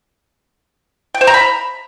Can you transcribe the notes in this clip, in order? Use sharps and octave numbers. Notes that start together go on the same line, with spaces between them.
G5
C5
A#5
B5